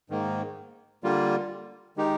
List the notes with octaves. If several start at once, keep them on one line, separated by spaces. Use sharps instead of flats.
G#2 D#3 A#3
D3 G3 A#3 F4
D#3 G#3 D#4 G4